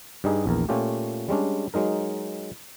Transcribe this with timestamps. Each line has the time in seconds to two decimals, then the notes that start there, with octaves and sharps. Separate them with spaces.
0.24 G2 G3 D#4 G#4
0.46 A#1 E2 A#4
0.69 A#2 A3 C#4 F4 G4
1.29 G3 G#3 C#4 D4
1.74 F#3 G#3 D#4 A#4